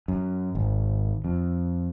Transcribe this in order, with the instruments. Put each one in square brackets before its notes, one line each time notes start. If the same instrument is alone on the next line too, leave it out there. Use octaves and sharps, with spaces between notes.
[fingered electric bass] F#2
G#1
F2